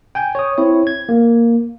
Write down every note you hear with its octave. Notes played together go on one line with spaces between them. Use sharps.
G5 G#5 G6
C#5 D#6
C4 E4 C#5
G#6
A#3